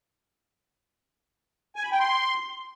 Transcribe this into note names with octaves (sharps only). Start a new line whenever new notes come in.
G#5
B5
G5
C6